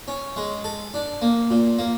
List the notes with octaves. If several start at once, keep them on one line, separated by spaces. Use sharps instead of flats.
C#4
G#3
A4
D4
A#3
A#2
A#3